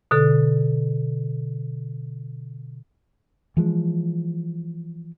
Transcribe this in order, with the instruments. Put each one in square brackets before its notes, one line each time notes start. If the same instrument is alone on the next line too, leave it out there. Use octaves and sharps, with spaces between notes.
[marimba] B2 D3 A4
[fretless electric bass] E3 F3 G#3